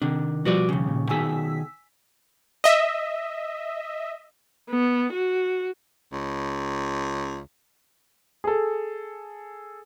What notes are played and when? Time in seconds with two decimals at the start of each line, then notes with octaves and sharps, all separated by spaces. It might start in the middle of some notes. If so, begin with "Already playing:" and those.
0.02 C3 D#3 D4
0.45 B2 F3 G3 F#4 B4 D5
0.69 D#2 C#3
0.89 A#2
1.09 B2 D#3 G#4 G#5 E6 B6
2.64 D#5 E5
4.70 B3
5.13 F#4
6.12 C#2
8.44 G#4 A4